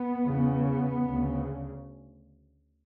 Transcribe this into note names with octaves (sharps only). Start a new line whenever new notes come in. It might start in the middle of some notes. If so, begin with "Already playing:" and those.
Already playing: B3
E2 C#3
B3
D2 C#3